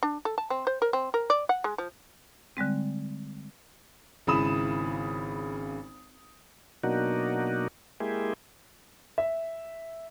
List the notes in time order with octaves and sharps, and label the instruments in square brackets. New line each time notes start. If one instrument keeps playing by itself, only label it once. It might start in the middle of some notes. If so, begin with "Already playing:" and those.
[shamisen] D4
A4
A5
C4
C5
A#4
C4
A#4
D5
F#5
G#3
F3
[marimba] D3 G3 G#3 C4
[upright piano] G#1 C#3 E4 B5 D#6 E7
[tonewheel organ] B2 F#3 A#3 D4 D#4 F#4
G#3 A#3 E4 G4 G#4
[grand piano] E5